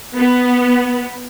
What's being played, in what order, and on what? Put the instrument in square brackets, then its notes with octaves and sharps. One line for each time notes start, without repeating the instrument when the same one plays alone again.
[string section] B3